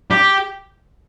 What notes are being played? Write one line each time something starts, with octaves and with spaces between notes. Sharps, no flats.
G4